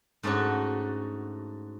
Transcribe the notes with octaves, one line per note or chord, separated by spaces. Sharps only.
G#2 A3 C#4 D4 F#4